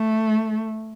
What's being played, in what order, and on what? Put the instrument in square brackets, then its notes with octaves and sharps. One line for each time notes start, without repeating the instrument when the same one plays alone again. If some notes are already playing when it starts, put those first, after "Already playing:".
Already playing: [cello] A3